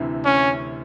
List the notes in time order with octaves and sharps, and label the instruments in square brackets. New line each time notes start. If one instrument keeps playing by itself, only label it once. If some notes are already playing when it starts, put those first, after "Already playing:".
Already playing: [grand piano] D2 C3 E3
[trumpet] C#4